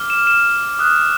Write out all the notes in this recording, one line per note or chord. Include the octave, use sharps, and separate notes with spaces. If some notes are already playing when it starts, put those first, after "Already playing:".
Already playing: D6 F6
E7
E7
D#6 F#6